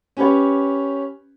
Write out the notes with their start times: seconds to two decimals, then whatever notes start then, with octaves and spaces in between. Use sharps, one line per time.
0.17 C#4 G4 B4 C#5